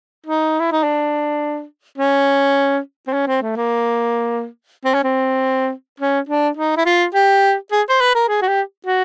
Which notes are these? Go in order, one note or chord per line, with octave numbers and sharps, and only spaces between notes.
D#4
E4
D#4
D4
C#4
C4
C#4
C4
A3
A#3
C4
C#4
C4
C#4
D4
D#4
E4
F4
G4
G#4
C5
B4
A#4
G#4
F#4
G4
F#4